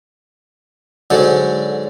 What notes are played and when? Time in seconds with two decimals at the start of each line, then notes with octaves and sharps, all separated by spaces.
1.10 G#2 D3 F#3